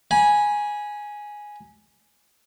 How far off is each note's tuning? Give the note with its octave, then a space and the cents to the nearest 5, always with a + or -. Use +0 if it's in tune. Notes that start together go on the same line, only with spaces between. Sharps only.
G#5 +0 B5 -30